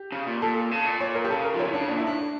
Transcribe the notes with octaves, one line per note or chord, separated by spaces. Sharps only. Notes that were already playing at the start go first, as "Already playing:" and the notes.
Already playing: G4
C#3
A#2
A#2 A4
C#3
A#2
C#5
A#4
G4
C#3 A4
A#4
F3
E3 C#5
D3 D4
C#3
A#2 D4
E4
A2 D4